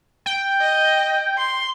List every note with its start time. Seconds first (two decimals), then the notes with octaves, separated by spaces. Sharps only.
0.26 G5
0.61 D#5
1.38 C6